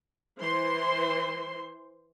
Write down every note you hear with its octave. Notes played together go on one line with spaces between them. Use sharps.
E3 C5 C6